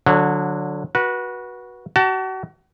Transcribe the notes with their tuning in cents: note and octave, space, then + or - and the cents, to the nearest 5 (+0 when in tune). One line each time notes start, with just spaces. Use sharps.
D3 +0 F#3 -25
F#4 +0 B4 -25
F#4 +35 A5 +20